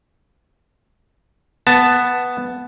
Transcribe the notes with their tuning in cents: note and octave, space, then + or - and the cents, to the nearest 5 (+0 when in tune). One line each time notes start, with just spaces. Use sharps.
B3 +0 A5 +0